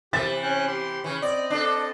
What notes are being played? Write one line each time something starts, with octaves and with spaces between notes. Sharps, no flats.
C3 E3 G4 E5 A6
C#4 G5 F#6
G4 C6
C#3 E3 C#5
C4 D5 D#5
D4 A4